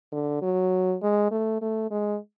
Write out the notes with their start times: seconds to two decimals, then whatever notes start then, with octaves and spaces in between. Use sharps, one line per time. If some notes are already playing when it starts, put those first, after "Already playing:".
0.12 D3
0.42 F#3
1.03 G#3
1.31 A3
1.62 A3
1.91 G#3